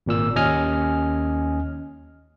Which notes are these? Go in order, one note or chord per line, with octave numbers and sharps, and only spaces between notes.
G#1 A#2 E6
D#2 C#4 D#5 G#5 F6